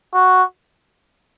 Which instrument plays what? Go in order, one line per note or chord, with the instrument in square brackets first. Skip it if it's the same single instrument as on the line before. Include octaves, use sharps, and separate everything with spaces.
[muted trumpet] F#4